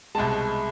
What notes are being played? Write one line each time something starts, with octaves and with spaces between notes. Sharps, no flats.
C2 B2 G#3 A5